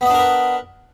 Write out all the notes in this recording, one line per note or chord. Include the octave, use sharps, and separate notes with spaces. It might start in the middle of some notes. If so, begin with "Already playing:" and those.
B3 D4 A#4 B4 D#5